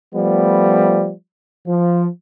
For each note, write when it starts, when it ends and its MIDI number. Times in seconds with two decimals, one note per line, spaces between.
0.15 1.11 53
0.15 1.11 55
0.15 1.11 57
0.15 1.11 59
1.66 2.08 53